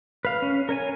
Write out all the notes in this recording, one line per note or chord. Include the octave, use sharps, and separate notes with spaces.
B4 F5
C#4
A#4 C#5 G#5